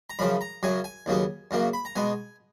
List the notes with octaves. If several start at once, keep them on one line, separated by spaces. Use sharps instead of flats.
A#5
F#2 C#3 F3 B5
A#5
F#2 C#3 F#3 G#5
G#5
D#2 C#3 F#3 B3
F#2 C#3 F#3 A#3
B5
A#5
B2 G#3 B3 G#5